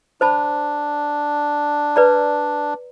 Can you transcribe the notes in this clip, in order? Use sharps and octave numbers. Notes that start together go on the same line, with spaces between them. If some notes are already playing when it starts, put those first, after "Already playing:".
D4 C5 A5 B5
B4 D5 A#5